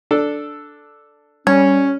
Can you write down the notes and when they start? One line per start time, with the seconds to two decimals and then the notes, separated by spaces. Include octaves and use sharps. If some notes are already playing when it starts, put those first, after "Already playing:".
0.11 D4 A4
1.47 G3 C#4 C#5